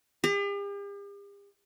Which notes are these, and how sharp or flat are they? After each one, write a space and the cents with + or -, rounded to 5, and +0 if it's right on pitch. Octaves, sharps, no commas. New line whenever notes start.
G4 +45